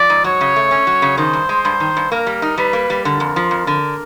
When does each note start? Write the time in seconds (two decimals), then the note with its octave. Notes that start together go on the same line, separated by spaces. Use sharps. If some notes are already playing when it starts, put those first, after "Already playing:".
Already playing: F3 D5
0.10 G#2
0.24 F#3 C#5
0.41 C#3
0.56 A3
0.71 C#4
0.87 F#3
1.02 C#3
1.18 D#3 C5
1.33 G2
1.49 G#3
1.65 G2
1.80 D#3
1.97 G2
2.11 A#3 A#4
2.27 G3
2.42 D#4
2.58 G3 B4
2.73 A#3
2.90 G3
3.05 D3 A#4
3.20 F2
3.36 F3
3.51 F2
3.67 D3